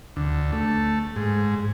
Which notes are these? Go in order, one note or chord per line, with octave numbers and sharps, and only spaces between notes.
D2
A3
G#2